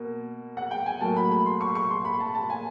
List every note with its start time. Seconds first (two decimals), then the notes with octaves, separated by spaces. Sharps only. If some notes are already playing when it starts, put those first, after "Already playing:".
Already playing: B2 A#3
0.57 F#5
0.71 G5
0.86 G#5
1.01 A2 F#3 A#3 A5
1.16 B5
1.31 B5
1.46 C6
1.61 C#6
1.75 C#6
1.90 C6
2.05 B5
2.20 A5
2.35 A5
2.50 G#5